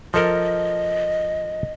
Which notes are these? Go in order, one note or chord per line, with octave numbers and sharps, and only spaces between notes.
F3 A4 A#4 D#5